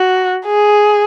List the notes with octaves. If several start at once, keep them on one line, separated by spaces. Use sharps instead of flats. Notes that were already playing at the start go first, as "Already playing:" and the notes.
Already playing: F#4
G#4